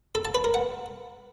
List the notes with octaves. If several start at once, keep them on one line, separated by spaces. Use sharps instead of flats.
A4
A5
B4
A#4
F#5